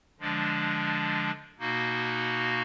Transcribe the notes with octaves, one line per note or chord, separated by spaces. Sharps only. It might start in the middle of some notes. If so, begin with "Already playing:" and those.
D3 F3 G#3 D4
B2 A#3 D#4 F#4